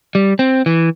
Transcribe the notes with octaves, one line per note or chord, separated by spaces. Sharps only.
G3
C4
E3